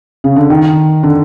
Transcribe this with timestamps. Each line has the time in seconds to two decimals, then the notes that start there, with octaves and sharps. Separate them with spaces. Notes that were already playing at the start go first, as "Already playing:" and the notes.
0.24 C#3
0.36 D3
0.50 D#3
1.03 D3